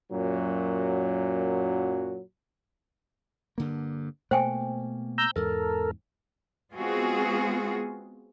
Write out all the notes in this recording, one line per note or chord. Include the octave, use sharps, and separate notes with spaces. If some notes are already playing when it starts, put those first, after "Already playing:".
F#2 A#2 F#3
G2 D3 A#3
B2 A3 A#3 C5 G5 G#5
A#5 E6 G6
E2 G#2 A4 A#4
G#3 B3 C4 F4 F#4 G#4